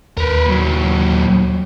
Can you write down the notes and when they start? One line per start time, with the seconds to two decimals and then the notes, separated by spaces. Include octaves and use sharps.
0.17 D#2 A#4 B4
0.46 A#2 F#3